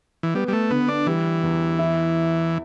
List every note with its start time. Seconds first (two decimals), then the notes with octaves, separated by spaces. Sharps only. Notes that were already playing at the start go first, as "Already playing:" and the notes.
0.23 E3
0.34 G3 B3
0.48 G3
0.53 A3
0.70 D3 B3
0.88 D4
1.07 E3 G3
1.43 E2
1.79 E4